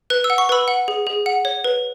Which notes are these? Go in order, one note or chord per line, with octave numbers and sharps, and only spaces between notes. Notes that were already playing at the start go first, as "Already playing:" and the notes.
B4 F#6
E6
F#5
C#6
B4 B5 E6
F#5
G#4
G#4
F#5
C#5
B4